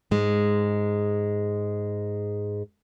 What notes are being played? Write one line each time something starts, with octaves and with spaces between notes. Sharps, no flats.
G#2 G#3